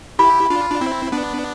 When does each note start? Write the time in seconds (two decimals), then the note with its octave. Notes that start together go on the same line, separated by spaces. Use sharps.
0.19 E4 G4 B5
0.50 D4 F4
0.70 D4
0.81 C4 E4
1.12 B3 D4